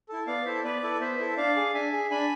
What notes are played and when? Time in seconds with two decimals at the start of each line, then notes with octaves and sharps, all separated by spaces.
0.09 E4 A4
0.27 B3 D5 F5
0.45 E4 A4 C5 E5
0.64 B3 B4 D5
0.83 E4 A4
1.01 B3 C5 E5
1.19 E4 A4
1.37 D4 D5 F5
1.56 G#4
1.74 D4 E5 G#5
1.92 G#4
2.11 D4 G#5 B5